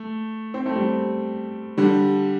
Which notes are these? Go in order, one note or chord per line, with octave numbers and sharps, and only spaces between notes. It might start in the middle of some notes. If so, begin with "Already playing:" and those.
Already playing: A3
C4
A3
G3 C4
D3 G3